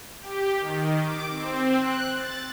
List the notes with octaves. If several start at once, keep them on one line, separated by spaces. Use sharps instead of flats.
G4
D#3
D6
C4
F#6
A6